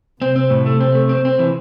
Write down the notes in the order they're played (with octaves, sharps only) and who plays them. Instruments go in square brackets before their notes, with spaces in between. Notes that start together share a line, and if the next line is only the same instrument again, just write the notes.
[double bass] C3 [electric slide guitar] C4
[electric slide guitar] C4
A2
A3
C4
A3
C4
C4
E3